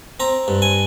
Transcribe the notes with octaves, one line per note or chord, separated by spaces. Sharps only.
C4 A#5
G2
G#5